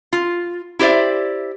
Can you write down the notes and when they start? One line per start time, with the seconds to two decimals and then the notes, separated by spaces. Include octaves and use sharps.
0.13 F4
0.79 E4 G4 C5 D5 E5